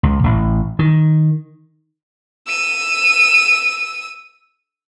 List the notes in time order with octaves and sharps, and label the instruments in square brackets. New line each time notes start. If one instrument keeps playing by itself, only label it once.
[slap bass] C#2
A1
D#3
[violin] E6 D#7